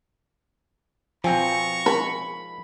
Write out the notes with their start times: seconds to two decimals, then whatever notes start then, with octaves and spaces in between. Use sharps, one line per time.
1.24 B2 F3 C4 G#5 A#5 C#6
1.86 B5